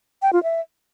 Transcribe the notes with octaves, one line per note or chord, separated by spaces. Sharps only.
G5
F4
E5